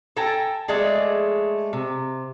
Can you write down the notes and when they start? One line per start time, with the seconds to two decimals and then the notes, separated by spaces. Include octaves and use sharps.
0.17 A4 G5 G#5 A#5
0.68 G#3 A3 G#4 D5
1.73 C3